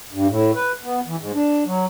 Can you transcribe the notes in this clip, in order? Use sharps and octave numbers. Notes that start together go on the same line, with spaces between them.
G2
A2
B4
B3
E3
G#2
D4
F#3